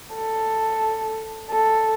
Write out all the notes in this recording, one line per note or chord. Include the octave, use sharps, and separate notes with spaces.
A4
A4